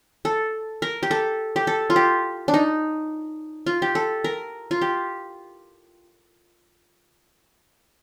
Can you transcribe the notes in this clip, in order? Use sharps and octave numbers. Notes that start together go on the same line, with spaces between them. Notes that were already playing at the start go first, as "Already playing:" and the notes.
A4
A#4
G4
A4
G4
A4
F4
G4
D4
D#4
F4
G4
A4
A#4
F4
G4